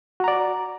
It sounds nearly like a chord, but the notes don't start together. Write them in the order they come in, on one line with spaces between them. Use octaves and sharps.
F#4 A#5 D5